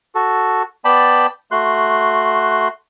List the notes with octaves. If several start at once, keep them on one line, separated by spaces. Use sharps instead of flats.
F#4 A4
B3 D5 G5 A5 B5
A3 F#4 C6 F#6